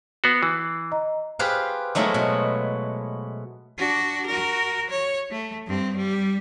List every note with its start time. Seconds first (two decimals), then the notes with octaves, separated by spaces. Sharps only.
0.24 B3 F#4 C7
0.43 E3
0.92 D#5 A#5
1.39 F4 G4 G#4 B4 C5 F5
1.95 F#3 G#3 A3 B3 E4 F4
2.14 B2
3.78 D4 F#4
4.26 F#4 A#4
4.90 C#5
5.31 A3
5.66 G2 C4
5.97 G3